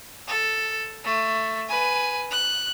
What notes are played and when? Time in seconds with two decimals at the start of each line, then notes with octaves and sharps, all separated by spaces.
0.27 A4
1.05 A3
1.68 B4 G#5
2.31 F#6